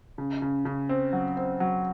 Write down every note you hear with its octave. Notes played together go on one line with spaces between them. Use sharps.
C#3
C#3
C#3
C4
F#3
C4
F#3